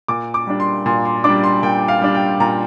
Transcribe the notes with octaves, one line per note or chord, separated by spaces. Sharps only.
A#2 D6
D6
G3 D4
C6
A#2 C6
C6
G3 D4 D6
C6
A#2 G5
F5
G3 D4
G5
A#2 A#5